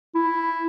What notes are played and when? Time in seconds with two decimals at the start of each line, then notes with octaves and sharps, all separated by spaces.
0.15 E4